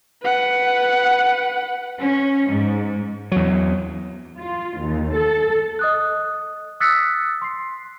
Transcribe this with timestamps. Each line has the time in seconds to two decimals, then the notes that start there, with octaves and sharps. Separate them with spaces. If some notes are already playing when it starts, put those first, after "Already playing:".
0.22 B4 F#5
2.00 C#4
2.49 G#2
3.32 E2 F#3
4.40 F4
4.80 D#2
5.16 A4
5.79 D#5 D#6 F#6
6.80 D#6 E6 F#6 A6 B6 C#7
7.42 C6 C7